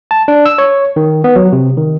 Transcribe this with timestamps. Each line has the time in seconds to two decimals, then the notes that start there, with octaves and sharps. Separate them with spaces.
0.11 A5
0.28 D4
0.46 E6
0.58 C#5
0.96 D#3
1.24 B3
1.36 F#3
1.53 C3
1.77 D#3